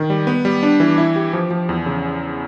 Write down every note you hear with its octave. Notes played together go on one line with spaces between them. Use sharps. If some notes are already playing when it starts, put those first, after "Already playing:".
Already playing: D#3
G3
B3
G3
D4
E3
E4
G4
F3
F3
E2
C#3